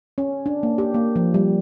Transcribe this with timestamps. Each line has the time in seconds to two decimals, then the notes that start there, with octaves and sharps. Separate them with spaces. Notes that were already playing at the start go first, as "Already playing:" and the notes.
0.18 C#4
0.46 D4
0.63 A#3
0.78 G4
0.94 A#3
1.16 F3
1.34 G3